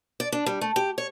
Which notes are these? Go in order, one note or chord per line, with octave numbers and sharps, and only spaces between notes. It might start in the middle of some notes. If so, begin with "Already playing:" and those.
D5
D4
G3
A3
G4
C#5